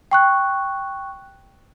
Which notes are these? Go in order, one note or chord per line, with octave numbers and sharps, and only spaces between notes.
G5 C#6 F#6